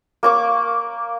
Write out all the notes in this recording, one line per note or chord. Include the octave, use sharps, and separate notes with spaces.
A#3 C#6 D6